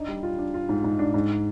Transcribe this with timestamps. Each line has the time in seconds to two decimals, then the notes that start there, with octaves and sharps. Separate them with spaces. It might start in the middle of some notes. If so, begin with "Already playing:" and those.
Already playing: D4 D#4
0.08 G3
0.23 F4
0.39 D4
0.54 F4
0.69 G#2
0.84 G#2
0.99 D4
1.14 G#2